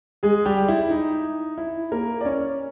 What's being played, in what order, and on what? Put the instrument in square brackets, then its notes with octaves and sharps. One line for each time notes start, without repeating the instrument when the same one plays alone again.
[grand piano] G#3 G#4
G3 G4
E4
D#4
E4
A#3 A#4
D5
C#4 C#5